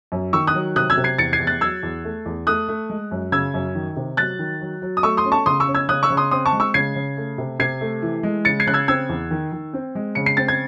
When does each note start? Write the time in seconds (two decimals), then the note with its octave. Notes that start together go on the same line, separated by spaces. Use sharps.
0.12 F#2
0.33 D#3 C#6 E6
0.47 D#6 F#6
0.54 F#3
0.76 C3 D#6 F#6
0.90 E6 G#6
0.97 C3
1.04 G#6 C7
1.18 E2 A6 C#7
1.33 G#6 C7
1.40 E2
1.47 F#6 A6
1.61 F#3 E6 G#6
1.83 E2
2.04 A3
2.26 E2
2.47 A3 D#6 F#6
2.68 A3
2.90 G#3
3.11 F#2
3.32 C#3 E6 G#6
3.54 F#2
3.75 D#3
3.96 C3
4.17 F#3 F#6 A6
4.39 D#3
4.61 F#3
4.82 F#3
4.97 D#6
5.03 A3 C#6 E6
5.17 C6 D#6
5.25 C#4
5.32 A5 C#6
5.46 C#3 C6 D#6
5.60 C#6 E6
5.68 C#4
5.75 E6 G#6
5.88 C#3 D#6 F#6
6.03 C#6 E6
6.10 C#3
6.17 C6 D#6
6.31 C4 C6 D#6
6.46 A5 C#6
6.53 G#3
6.60 C#6 E6
6.74 C#3 G#6 C7
6.95 C#3
7.17 A3
7.38 C3
7.59 C3 G#6 C7
7.81 A3
8.02 E3
8.23 G#3
8.45 C#3 A6 C#7
8.60 G#6 C7
8.67 C#3 F#6
8.74 E6 G#6
8.88 C4 E6 G#6
9.09 E2
9.31 D#3
9.52 D#3
9.73 C4
9.95 G#3
10.15 C#3 C#7
10.26 C7
10.37 C4 A6
10.48 G#6